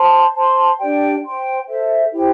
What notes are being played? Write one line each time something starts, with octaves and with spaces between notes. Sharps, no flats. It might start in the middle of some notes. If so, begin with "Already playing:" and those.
Already playing: C5 A5 C6
C5 A5 C6
D4 G4 D5 G5
C5 G5 C6
A4 C5 E5
E4 G4 C5 G5